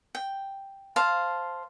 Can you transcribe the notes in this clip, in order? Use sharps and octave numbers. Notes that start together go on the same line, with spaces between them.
G5
C5 F5 A5